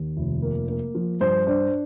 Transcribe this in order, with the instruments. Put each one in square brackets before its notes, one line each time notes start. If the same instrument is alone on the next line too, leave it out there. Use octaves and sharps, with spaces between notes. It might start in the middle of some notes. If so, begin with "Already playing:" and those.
Already playing: [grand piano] D#2
F1
A#3
A#3
F3
G2 C5
D4 C5